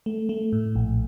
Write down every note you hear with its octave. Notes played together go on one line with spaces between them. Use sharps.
A3
A3
A2
A#1